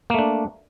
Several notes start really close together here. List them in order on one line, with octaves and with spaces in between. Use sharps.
A#3 A3 D4